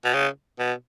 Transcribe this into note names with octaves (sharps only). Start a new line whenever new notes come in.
B2
C#3
B2